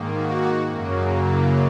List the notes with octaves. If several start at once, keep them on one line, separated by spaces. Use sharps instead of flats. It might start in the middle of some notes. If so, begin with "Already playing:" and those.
Already playing: G#2 D#3 A#3
F#4
F#2 C#3 F#3 A#3
E4